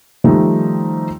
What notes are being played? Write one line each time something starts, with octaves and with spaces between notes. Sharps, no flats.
D#3 F3 G3 A3 D#4